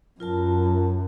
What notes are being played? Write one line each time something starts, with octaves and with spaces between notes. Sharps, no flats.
F#2 F4 A#4 A5